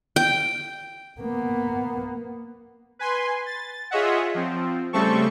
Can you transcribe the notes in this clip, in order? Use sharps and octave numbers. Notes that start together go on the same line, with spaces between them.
G5
A#3 B3
B4 G#5 C6
A6
F4 G#4 C#5 D#5 E5 F#5
F3 C4
C#3 G3 A3 C4 A4 C#6